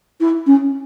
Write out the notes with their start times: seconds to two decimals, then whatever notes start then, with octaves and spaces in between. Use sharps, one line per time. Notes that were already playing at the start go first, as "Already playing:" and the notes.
0.20 E4
0.47 C#4